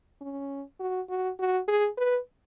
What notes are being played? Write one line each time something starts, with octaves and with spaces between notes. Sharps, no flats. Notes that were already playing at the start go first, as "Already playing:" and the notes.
C#4
F#4
F#4
F#4
G#4
B4